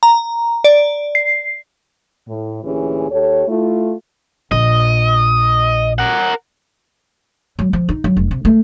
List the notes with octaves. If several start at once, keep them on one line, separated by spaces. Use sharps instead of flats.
A#5
D5
C7
A2
D2 A#2 E3 C#4 G4 G#4
D#2 G4 A4 C#5
A3 E4 F4
A#1 D#5
A#4 F#5
F#3
F3
D#4
F#3
F1
C3
A3